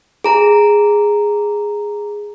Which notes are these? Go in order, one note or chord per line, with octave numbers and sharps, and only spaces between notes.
G#4 A#5